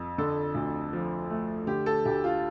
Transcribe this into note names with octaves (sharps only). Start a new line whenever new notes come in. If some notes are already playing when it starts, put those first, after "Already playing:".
Already playing: F2
D3 A4
D2
F3
A3
D3 G4
A4
D2 G4
F4